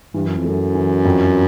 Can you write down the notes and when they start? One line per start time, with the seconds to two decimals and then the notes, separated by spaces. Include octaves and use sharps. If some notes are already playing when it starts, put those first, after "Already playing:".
0.14 G2 E3
0.26 F#2
0.36 F2
0.44 F#2 A3
0.75 E3
1.05 F2